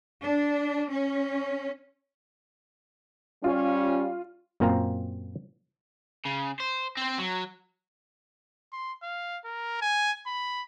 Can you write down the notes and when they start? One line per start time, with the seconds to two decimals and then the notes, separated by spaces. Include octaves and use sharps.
0.23 D4
0.91 C#4
3.44 G3 C#4 F4
4.60 F#2 A#2 A#3 C4 F4 A#5
6.25 C#3
6.60 C5
6.97 C4 C5
7.18 F#3
8.73 C6
9.03 F5
9.45 A#4
9.81 G#5
10.26 B5